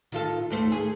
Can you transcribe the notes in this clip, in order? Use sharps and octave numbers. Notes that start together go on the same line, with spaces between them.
D#3 F4 A4
D#2 A3 C5
G#4